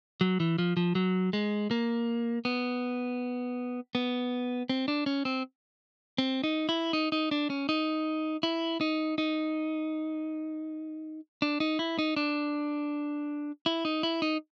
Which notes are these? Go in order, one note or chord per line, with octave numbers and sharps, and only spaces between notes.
F#3
E3
F3
F3
F#3
G#3
A#3
B3
B3
C4
D4
C#4
C4
C4
D#4
E4
D#4
D#4
D4
C#4
D#4
E4
D#4
D#4
D4
D#4
E4
D#4
D4
E4
D#4
E4
D#4